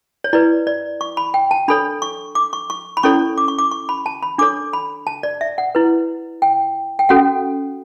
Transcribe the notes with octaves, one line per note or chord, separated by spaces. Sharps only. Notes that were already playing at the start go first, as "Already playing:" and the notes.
C#5
E4 B4 D5
D5
C#6
B5
G5
A5
D4 A4 C#5 B5
C#6
D6
C#6
C#6
B5
C#4 E4 A4 C#5 C#6
D6
C#6
D6
C#6
B5
A5
B5
D4 A4 C#5 D6
B5
A5
D5
E5
F#5
E4 B4
G5
G5
C#4 F#4 A4 F#5